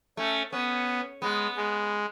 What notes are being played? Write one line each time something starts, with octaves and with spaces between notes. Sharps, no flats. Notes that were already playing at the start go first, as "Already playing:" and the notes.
A3 C#4
B3 C#4
G#3 B3
G#3